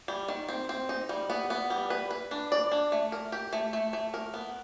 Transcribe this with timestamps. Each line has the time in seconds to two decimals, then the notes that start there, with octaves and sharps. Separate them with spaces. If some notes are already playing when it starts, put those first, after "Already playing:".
0.08 G3
0.28 D#3
0.49 C4
0.69 C4
0.89 D#4
1.09 G3
1.30 B3
1.50 B3
1.70 G3
1.90 B4
2.11 B4
2.31 D4
2.52 D5
2.72 D4
2.92 A3
3.12 A#4
3.32 G4
3.53 A3
3.73 A3
3.93 A3
4.14 A#4
4.34 B3